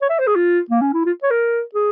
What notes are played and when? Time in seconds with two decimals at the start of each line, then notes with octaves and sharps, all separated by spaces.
0.02 C#5
0.10 E5
0.19 C5
0.27 G#4
0.36 F4
0.71 A#3
0.82 C#4
0.94 E4
1.06 F4
1.23 C#5
1.31 A#4
1.75 G#4